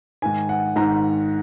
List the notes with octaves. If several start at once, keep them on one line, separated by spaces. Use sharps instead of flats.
G#2 D#3 G#5
F#5
G#2 D#3 A#5